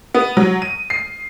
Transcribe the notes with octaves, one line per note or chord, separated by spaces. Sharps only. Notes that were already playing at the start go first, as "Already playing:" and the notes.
B3
F#3
D#7
C7